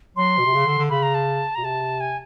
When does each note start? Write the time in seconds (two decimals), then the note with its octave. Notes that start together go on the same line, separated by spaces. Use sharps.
0.17 F#3 C6
0.38 B2
0.46 C3
0.54 C#3
0.67 D3
0.78 D3
0.90 C#3 B5
1.03 A#5
1.14 A5
1.55 B2 A#5
1.64 C3 A5
2.00 G#5